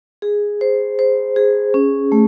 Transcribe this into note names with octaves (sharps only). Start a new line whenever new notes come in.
G#4
C5
C5
G#4
C#4
A3